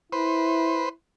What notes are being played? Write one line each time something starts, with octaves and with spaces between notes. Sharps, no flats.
E4 B4 C5